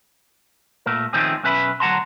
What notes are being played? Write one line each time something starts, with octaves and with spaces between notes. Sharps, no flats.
A#2 A3 A#4
D#3 F3 A3 C4 C#4 G#4
B1 C#4 B4 E5 A#5 B5
D2 F#3 F#5 A5 A#5 C6